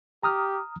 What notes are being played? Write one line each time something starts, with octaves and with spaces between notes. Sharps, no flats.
G4 A#5 D#6 F6